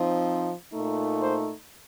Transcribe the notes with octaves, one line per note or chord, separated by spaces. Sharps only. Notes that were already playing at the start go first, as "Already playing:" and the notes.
Already playing: F3 C4 D#4
A#2 A3 D#4
C5